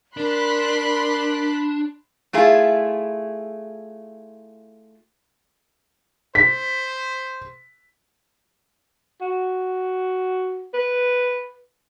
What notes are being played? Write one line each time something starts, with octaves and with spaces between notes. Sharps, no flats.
D4 A#4 B5 C6 F#6
A3 E4 F4 G#4
C5 B6
F#4
B4